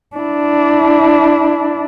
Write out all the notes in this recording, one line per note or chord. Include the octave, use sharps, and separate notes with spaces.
D4 E4